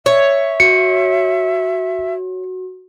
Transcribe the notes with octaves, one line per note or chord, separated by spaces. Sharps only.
C#5 E5
F#4 C#7